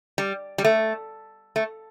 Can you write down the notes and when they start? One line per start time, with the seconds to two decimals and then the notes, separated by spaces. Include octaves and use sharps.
0.18 G3
0.58 G3
0.65 A3
1.56 A3